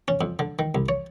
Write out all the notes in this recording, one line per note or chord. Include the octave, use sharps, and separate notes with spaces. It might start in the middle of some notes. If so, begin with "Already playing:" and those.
C#4
F2
D3
D#3
C2
C#5